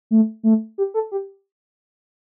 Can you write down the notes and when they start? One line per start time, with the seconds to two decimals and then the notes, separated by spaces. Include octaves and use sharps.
0.11 A3
0.43 A3
0.78 G4
0.94 A4
1.12 G4